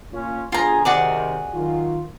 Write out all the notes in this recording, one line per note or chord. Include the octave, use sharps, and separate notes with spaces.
A#2 C#4 F4
G1 F4 G#4 G#5 A#5
C3 D#3 F#4 G#4 D5
D#3 F#3 F4